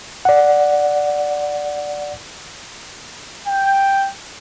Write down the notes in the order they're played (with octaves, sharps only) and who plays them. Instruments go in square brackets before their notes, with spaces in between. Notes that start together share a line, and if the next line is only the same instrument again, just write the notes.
[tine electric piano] D5 F#5
[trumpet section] G5